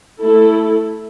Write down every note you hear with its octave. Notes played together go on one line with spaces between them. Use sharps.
A3 E4 A4